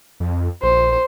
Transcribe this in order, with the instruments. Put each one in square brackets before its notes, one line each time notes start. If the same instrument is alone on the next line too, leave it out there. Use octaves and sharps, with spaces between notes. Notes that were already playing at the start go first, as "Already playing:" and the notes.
[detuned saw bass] F2
[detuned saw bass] A#1 [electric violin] C5